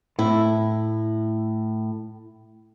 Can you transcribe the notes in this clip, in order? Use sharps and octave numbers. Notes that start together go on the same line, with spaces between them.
A2 E4